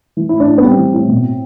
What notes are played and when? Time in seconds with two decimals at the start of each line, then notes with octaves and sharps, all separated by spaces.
0.17 E3
0.29 A2 E4
0.40 D4
0.47 A2
0.58 B3
0.63 G3 C4
0.77 E3
0.94 A2
1.08 B2